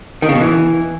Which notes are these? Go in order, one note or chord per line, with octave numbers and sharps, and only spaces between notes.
D#3
C#3
B2
E3